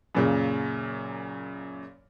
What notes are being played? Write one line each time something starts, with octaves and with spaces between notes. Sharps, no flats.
F#2 A#2 C#3